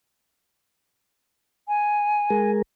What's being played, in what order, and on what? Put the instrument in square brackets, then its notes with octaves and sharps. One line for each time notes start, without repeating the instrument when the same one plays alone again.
[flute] G#5
[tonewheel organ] G#3 G#4 A#4